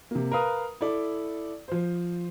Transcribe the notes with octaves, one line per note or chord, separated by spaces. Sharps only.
C3 A#3
A#4 B4 F5 D#6
E4 A4 D5
F3 C5